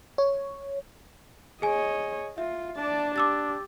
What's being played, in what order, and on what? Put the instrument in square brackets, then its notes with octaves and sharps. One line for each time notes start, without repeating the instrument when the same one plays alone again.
[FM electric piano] C#5
[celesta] G#4 G#5 [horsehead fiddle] C#5 D#5
[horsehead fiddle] F4 [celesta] E5
[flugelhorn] D4 [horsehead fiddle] D5 A5
[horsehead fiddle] G4 [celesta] D6 E6 A6